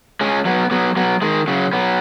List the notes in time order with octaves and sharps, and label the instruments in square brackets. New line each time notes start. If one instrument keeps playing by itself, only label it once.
[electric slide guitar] G#3 C#4
F#3 B3
F#3 B3
F#3 B3
D#3 G#3
C#3 F#3
F#3 B3